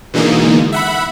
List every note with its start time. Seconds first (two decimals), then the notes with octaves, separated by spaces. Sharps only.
0.14 B2 D3 E3 G#3 A#3 D#4
0.72 E5 F#5 B5